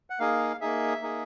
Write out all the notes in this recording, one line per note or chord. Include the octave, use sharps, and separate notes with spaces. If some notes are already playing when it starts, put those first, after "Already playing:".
F#5
A#3 D#4 G#4 F5
A#3 D#4 G#4 E5
A#3 D#4 G#4